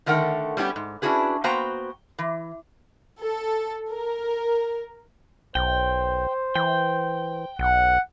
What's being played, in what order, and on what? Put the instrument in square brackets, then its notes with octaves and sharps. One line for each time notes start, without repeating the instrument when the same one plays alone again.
[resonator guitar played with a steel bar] D3 D#3 A3 A#4 F#5 G5
G3 B3 C#4 F#4 G4
G#2
C#4 D4 E4 F#4 G#4 B4
A#3 B3 F#4 C5 G5 A#5
E3
[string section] A4
A#4
[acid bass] B1 [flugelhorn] C5 [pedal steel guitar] G5
[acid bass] E3 [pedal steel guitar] G5
[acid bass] B1 [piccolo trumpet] F#5